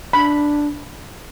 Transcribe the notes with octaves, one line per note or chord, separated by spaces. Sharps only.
D4 B5